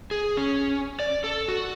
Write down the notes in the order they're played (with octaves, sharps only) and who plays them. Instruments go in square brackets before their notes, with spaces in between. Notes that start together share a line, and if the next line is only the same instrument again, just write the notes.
[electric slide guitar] G#4
C#4
D5
A4
F#4